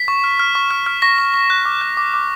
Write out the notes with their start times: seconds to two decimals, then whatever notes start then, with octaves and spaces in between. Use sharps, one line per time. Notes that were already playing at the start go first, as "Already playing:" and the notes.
Already playing: B6
0.08 C#6
0.24 F6
0.39 F6
0.55 C#6
0.71 F6
0.86 F6
1.02 C#6 A#6
1.18 C#6
1.34 C#6
1.50 F#6
1.65 D6
1.81 F#6
1.97 D6
2.14 D6